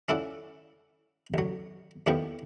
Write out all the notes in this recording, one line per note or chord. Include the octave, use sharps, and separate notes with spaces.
C#4 E4 F4 A4 D5 F#5
A1 F#3
D#2 A2 F3 B3 G5 C#6